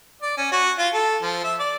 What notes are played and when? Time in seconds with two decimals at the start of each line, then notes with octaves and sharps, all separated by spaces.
0.22 D5
0.37 C#4
0.52 F#4
0.79 F4
0.94 A4
1.22 F3
1.44 E5
1.59 D5